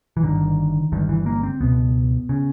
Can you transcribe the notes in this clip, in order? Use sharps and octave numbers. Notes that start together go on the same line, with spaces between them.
E3
G1 G2 D3 D#3
G1 G2 D3 D#3
E3
A#3
C4
C#2 B2 B3
C#3